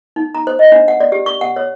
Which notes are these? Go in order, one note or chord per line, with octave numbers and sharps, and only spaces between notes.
D#4
A#5
C5
D#5
D4
F#5
D5
G4
C#6
F#5
C#5